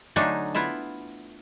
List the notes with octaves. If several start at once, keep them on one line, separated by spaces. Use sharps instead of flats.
D3 F#3 A3 D4 D#4 G#5
B3 E4 F4 E5